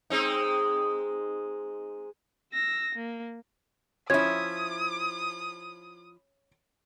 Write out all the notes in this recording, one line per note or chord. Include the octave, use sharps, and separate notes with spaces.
G#3 C4 D#4
E6 A#6
A#3
F3 C#4 E4 D#6 G#6